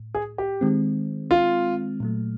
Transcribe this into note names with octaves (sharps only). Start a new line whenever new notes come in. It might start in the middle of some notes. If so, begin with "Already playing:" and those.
Already playing: A2
G#4
G4
D#3 G#3 C4
F4
A#2 F#3 A3